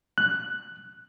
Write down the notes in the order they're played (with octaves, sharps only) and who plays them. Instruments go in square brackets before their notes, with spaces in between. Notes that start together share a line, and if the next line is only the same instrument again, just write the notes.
[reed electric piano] F#6